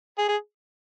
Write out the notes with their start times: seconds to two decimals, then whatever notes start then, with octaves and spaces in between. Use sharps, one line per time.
0.18 G#4
0.28 G#4